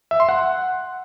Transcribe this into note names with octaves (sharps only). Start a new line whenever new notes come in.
E5
C6
F#5